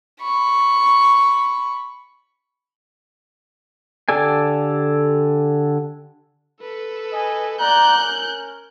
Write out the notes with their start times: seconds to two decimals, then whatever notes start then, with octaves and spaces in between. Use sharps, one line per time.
0.22 B5 C#6
4.09 D3 G4 A4 D5 G#5
6.61 A4 B4
7.14 D#5 G#5
7.60 D5 F#5 A#5 F#6 G6
7.97 C#4 A#4